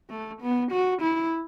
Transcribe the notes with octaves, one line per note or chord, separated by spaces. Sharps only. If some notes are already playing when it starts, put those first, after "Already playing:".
A3
B3
F#4
E4